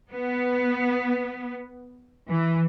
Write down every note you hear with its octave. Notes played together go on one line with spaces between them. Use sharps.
B3
E3